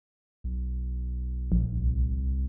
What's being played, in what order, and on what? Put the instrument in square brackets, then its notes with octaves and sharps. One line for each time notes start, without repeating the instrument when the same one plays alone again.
[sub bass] B1
[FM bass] A#1
[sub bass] C2